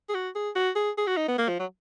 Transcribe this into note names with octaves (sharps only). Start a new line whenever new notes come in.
G#4
F#4
G#4
F#4
G#4
G#4
F#4
D#4
B3
A#3
F3
F#3